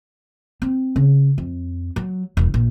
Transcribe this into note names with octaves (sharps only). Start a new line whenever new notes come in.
C4
C#3
F2
F#3
E1
A#1